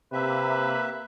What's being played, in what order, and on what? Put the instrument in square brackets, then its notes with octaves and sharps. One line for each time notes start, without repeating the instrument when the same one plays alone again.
[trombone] C3 [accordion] A#3 E5 [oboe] B4